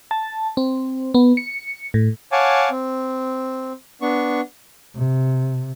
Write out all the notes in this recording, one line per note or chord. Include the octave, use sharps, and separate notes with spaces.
A5
C4
B3
C#7
A2
C#5 F5 F#5 G#5 A5 D6
C4
B3 D4 C#6
C3